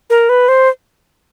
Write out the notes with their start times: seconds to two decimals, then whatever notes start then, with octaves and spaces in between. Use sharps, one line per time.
0.10 A#4
0.29 B4
0.48 C5